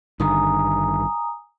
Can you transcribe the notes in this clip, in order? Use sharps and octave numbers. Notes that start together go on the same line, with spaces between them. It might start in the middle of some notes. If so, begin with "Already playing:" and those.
G#1 G2 D3 D#3 G#5 A#5 D#6